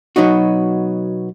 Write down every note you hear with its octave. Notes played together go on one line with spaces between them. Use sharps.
B2 F#3 B3 D#4 F#4